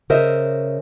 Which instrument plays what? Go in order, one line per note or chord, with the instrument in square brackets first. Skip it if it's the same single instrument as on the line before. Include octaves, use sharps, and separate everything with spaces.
[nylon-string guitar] C#3 A#4 C5 D#5 E5